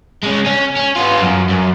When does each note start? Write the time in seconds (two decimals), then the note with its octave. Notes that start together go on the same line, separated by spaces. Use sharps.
0.23 G#3 C#4
0.46 C#4
0.76 C#4
0.96 B3 F4
1.22 F#2
1.50 F#2